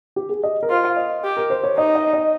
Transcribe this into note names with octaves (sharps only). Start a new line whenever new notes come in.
G4
G#4
D#5
A#4
F4 C5
F5
D#5
G4
A#4
C5
C#5
D#4 D#5
D#5
D#5